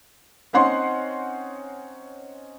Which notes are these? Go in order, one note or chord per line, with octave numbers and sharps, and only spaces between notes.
C4 C#4 D#4 F#5 C6